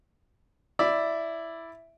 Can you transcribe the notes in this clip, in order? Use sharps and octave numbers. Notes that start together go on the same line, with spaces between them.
E4 D5 E5